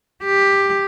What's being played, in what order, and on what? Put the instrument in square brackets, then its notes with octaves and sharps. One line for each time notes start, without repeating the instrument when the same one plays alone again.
[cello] G4